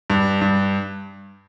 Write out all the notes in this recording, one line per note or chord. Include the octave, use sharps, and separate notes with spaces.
G2
G2